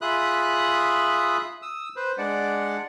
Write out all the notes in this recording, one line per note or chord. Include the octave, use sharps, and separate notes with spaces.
F4 G#4 E5 B5 D#6 F#6
D#6 E6
B4 C5
G#3 D4 D5 F#5